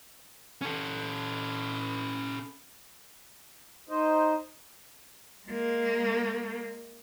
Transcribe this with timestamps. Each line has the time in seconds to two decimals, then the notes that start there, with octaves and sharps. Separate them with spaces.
0.61 C#4 A4
3.89 D#4 C5 D#5
5.47 G#3 A#3